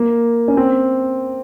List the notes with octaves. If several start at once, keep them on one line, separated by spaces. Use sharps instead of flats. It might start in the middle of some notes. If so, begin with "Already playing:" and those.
Already playing: A#3
C#4
C4